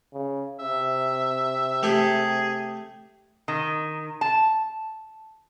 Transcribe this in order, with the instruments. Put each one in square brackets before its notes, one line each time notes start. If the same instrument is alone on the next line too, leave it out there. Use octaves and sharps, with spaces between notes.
[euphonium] C#3
[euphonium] C3 [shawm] E5
[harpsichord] A3 G4 [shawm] G#4
[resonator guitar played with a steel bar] D#3
A5